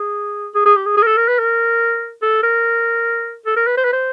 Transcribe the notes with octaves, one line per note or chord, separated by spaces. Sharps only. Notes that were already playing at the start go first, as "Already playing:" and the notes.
Already playing: G#4
G#4
G#4
G4
G#4
G#4
A#4
A4
A#4
B4
A#4
A4
A#4
A4
A#4
B4
C5
B4
C5